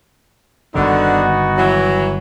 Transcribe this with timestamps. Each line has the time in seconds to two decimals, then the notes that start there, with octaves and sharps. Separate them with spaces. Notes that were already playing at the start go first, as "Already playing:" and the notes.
0.75 G1 D3 D#3 B3 D#4 F#4
1.58 E3 F#3